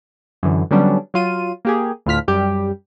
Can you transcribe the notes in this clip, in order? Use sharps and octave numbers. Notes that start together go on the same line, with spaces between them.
F#2 D3 E3
D3 F#3 G3 B3 C#4 D4
F#3 F4 D#7
A#3 G4 G#4
D2 A2 F4 F6 B6
F#2 G3 G4